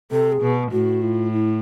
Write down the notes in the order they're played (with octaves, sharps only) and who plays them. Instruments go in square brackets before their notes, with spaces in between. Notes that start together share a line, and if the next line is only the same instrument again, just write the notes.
[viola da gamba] C3 [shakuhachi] A4
[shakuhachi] G#4
[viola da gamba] B2
[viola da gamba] A2 [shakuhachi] F#4
[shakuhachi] F4
E4